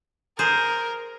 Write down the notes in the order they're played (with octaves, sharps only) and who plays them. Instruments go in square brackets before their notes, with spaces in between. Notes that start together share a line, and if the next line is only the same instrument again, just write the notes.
[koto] G#4 C5 [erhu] A#4